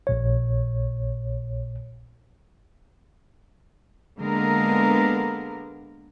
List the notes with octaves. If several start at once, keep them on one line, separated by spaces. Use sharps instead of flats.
A#1 A#2 C#5
D3 G#3 A#3 B3 A#4